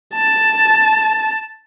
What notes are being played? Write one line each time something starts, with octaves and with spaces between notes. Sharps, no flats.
A5